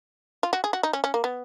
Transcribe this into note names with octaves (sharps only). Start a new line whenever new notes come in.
F4
F#4
G#4
F#4
D#4
C#4
C#4
A#3
B3